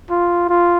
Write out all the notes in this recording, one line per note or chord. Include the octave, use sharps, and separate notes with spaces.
F4
F4